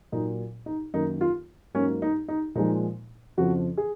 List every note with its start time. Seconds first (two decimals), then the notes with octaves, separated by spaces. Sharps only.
0.12 A#2 F#3 A#3 D#4
0.66 D#4
0.94 F#2 D#3 A#3 D#4
1.21 F4
1.74 G#2 F#3 A#3 C#4
2.02 D#4
2.28 D#4
2.55 A#2 F3 G#3 D#4
3.37 F2 C#3 F3 F#4
3.77 G#4